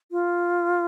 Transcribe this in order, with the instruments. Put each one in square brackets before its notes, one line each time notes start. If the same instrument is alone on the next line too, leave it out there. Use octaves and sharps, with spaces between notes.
[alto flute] F4